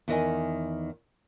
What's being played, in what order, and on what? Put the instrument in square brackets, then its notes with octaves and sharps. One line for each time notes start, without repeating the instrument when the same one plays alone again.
[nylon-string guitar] E2 D#3 D#5 G#5